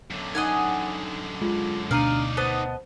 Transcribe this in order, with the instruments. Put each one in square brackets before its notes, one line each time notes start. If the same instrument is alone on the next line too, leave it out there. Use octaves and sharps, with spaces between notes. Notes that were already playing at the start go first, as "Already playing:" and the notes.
[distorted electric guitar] F#2 D3
[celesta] D#4 [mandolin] D#5 F#5 G#5
[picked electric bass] G#3 [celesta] F4
[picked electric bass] D2 B2 [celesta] D4 A#5 D#7 [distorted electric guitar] D#4 D5 [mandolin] F5
[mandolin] B3 D#5 A5 [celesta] C5